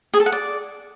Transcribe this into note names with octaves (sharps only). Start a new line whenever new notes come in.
G#4
A4
F#5
D5